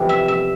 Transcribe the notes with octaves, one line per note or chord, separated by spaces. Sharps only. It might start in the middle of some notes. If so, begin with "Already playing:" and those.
Already playing: F2 C3 E3 G3 B3
E5
E5